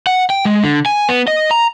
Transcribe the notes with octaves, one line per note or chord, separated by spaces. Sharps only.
F#5
G5
G#3
D3
G#5
B3
D#5
A#5